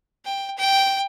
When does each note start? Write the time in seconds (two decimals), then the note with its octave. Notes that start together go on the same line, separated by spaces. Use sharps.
0.25 G5
0.58 G5